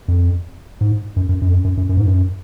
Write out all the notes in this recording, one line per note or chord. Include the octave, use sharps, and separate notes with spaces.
F2
G#2
F#2
F#2
F#2
F2
F#2
F#2
F#2
F#2
G#2
F#2